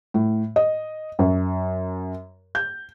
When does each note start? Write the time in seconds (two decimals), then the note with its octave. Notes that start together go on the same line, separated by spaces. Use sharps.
0.14 A2
0.56 D#5
1.19 F#2
2.55 G6